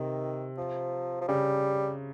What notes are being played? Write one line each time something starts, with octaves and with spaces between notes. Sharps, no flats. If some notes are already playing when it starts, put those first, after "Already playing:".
Already playing: C3 D#3
F3
F3
C#3 G3